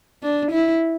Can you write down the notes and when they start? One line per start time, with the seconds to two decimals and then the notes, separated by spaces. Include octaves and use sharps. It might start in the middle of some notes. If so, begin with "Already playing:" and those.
0.23 D4
0.52 E4